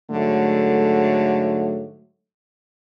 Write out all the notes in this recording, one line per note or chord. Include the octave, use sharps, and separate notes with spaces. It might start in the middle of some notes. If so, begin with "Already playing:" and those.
G#2 D3 F#3 A3